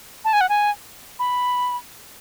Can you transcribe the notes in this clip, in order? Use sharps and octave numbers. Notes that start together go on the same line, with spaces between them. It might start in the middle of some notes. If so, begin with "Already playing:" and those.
A5
G#5
F#5
G#5
B5